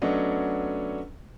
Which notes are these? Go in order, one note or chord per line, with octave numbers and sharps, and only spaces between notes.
F#3 A3 B3 C#4 D4 D#5